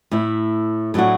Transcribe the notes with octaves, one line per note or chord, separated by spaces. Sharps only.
A2 A3 E4
A2 F#3 A3 D4 F#4